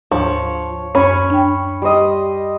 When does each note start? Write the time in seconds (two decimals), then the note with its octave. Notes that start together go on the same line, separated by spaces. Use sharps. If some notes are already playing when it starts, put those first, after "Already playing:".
0.12 D2 G#2 F3 D4 C#5
0.95 F#2 C#4 B5 C#6
1.30 D4 G5
1.82 G3 C5 D#5